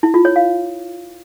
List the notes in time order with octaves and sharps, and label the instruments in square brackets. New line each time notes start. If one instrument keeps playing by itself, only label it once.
[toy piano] E4
F4
C#5
F5